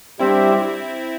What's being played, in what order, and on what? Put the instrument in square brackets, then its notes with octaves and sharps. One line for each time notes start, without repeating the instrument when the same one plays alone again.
[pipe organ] G3 D4 G4 C5 E5 [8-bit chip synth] C4 E4